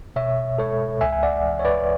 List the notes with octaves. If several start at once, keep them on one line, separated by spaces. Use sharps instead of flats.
B2 C#5 E5
G#3 A4 C#5
C#2 E5 G#5
G#5
D5 F#5
E3
C#5
B4 D5